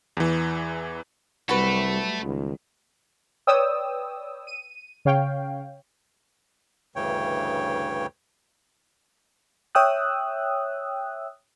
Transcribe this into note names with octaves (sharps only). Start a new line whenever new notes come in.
E2 E3
C2 F#3 G3 A3 F#4 B4
C#2 D#3
B4 C#5 D5 G5 D#6 E6
D#7
C#3 C#5 F5 G5
D2 G2 C#3 E3 C#5 G5
C#5 E5 G5 D#6 E6 F#6